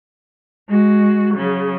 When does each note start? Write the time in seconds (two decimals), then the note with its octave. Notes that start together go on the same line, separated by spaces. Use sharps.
0.69 G#3 F#4
1.35 C#3 F#3